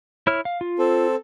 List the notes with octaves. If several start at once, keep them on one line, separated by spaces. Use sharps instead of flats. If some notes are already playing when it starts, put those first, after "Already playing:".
E4 C#5 F6
F5
F4
C4 A4